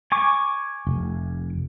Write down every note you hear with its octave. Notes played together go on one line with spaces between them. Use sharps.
G#5 C#6 D6
F1